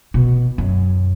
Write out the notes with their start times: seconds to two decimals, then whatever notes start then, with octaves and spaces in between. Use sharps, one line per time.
0.14 B2
0.58 F#2